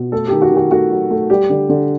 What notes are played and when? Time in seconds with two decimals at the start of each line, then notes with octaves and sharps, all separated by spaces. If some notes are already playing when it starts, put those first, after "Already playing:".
Already playing: B2
0.12 A3 A4
0.28 D#3 G4
0.42 F#4
0.51 D#3
0.57 F#4
0.71 A3 F#4
0.91 F#3
1.10 A3
1.30 G3 G4
1.50 D3
1.69 D3